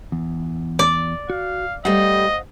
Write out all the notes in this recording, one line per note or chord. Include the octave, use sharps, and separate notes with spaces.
E2
D5
F#4 F5
G3 A3 C5 D#5 F5 F#5